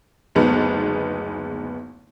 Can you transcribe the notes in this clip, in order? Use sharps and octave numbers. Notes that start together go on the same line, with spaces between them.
F#1 D2 G#3 B3 D#4